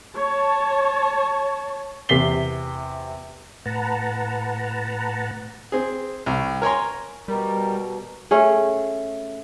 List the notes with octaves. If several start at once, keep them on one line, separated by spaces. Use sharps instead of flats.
C#5 A5
E2 C3 B6 C7 G7
A2 B4 F#5 A5 A#5
C4 G#4
C2
A#4 C#5 G#5 A#5 C6
B2 G3 A#4
A3 C#4 G#4